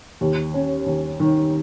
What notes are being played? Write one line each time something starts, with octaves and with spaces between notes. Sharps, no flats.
D#2
C#4
D#2
D#3